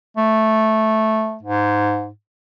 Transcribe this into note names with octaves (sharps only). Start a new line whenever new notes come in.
A3
G#2